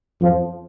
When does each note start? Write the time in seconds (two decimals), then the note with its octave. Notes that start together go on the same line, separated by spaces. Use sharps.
0.22 F2 F3